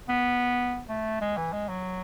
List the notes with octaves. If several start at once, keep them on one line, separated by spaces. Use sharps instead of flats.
B3
A3
G#3
E3
G#3
F#3